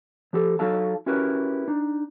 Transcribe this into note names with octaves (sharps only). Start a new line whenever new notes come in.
F3 G4 A4
F#3 D#4 F#4 A4 F5 A5
C#4 E4 F#4 G4 A#4 B4
D4 D#4